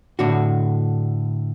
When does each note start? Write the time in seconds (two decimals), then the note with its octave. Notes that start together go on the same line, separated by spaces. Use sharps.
0.19 A2 D3 F#4